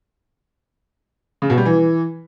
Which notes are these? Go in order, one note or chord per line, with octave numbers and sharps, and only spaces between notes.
C#3
B2
G3
E3